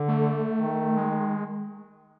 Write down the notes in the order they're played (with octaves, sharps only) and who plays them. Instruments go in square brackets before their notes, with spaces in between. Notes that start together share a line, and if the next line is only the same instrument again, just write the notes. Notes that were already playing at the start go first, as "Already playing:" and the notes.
Already playing: [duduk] D3
[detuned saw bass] A3
[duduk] D#3
[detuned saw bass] G#3